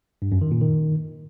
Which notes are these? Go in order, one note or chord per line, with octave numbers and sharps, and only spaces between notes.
G2
F#2
D#3
A#2
D#3